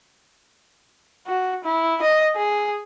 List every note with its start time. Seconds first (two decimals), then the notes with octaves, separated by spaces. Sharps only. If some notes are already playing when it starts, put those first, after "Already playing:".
1.27 F#4
1.64 E4
2.02 D#5
2.36 G#4